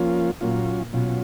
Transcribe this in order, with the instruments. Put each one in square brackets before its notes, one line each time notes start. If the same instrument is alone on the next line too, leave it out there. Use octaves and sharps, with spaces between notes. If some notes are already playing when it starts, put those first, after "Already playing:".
Already playing: [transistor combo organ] F3 A#3 C#4 F4
[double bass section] A#2 A#3 [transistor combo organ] F#3 C#4 F4
[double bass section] B2 B3 [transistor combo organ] F#3 C#4 F4